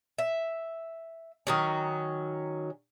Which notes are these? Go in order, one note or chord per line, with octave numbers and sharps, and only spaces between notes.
E5
D#3 F#3 C#4